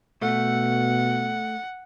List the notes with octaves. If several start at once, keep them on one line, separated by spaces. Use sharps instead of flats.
B2 A3 F#5